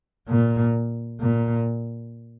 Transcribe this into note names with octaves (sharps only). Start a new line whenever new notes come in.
A#2
A#2